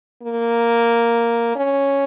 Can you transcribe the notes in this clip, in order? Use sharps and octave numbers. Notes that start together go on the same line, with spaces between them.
A#3
C#4